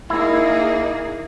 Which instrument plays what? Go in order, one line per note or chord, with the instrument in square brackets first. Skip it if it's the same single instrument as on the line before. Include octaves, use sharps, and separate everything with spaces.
[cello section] A#3 D#4 G#4 [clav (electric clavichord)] E4